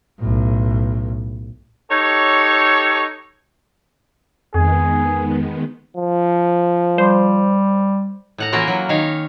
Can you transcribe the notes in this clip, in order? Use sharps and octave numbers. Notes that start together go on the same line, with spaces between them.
B1 A2
D#4 G4 A4 C#5
F2 D#3 G#3 B3 G#4
F3
G3 C5
A2 F#5 A#5
E3 A#3 C#4 F4 F#4 A#4
F#3
D#3 C#5 F5